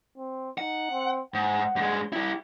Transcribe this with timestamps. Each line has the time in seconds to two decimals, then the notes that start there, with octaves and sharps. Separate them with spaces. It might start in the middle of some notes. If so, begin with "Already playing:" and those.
0.17 C4
0.58 D#4 F#5
0.90 C4
1.34 G#2 F#5
1.76 G2 G#3
2.13 G3 E4 G4